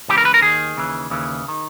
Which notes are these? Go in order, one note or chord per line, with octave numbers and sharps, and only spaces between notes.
C#2 C#3 E3 G4
A#4
B4
A#4
D#2 D#3 G#4
D#2 C#3 E3
D#2 C#3 E3
D#3